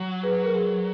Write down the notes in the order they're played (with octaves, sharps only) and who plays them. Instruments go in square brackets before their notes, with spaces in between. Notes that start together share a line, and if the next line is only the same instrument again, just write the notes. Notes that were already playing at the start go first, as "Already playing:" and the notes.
Already playing: [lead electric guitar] F#3
[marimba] G#4 B4
A#4
G#4 B4